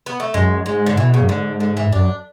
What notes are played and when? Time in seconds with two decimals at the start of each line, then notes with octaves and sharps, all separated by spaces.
0.06 B3
0.20 A3
0.34 F#2 G#3
0.66 G#2 G#3
0.86 D3
0.97 B2 E3
1.14 C#3
1.20 F#2
1.28 G#2 D3
1.60 D3
1.77 E3
1.92 F#2 D4